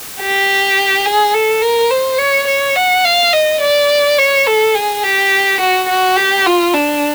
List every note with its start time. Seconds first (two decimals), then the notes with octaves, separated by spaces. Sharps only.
0.21 G4
1.06 G#4
1.34 A4
1.62 A#4
1.91 C5
2.19 C#5
2.47 C#5
2.76 F#5
3.04 F5
3.33 D#5
3.61 D5
4.18 C#5
4.47 A4
4.75 G#4
5.03 G4
5.60 F#4
5.88 F#4
6.17 G4
6.46 F4
6.74 D4